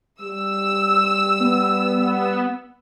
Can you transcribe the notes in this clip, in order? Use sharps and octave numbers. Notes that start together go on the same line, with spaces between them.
G3 E6
B3